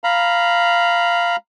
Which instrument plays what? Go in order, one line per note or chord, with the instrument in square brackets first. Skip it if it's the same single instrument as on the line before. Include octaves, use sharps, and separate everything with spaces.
[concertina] F5 A#5 B5